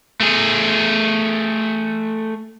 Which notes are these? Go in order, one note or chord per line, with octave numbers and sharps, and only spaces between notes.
A3 G#4